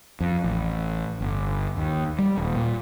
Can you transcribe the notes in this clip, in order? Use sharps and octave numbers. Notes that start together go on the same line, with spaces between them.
F2
A1
G1
D#2
G3
D#1
A#2